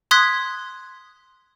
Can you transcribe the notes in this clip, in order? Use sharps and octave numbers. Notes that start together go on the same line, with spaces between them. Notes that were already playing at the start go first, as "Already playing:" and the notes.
C6 D#6 F#6 G#6 B6